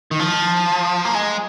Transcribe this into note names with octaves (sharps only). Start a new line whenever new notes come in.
D#3
F3
A#3
G#3